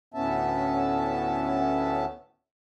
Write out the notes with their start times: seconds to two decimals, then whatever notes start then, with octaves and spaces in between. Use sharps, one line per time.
0.14 D2 A2 B3 C#4 E5 A5